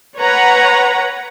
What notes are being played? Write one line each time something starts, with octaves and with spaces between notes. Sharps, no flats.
B4 C#5 F#5 A#5